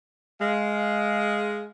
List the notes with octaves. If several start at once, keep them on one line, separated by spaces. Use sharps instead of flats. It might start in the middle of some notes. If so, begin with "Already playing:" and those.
G#3 F5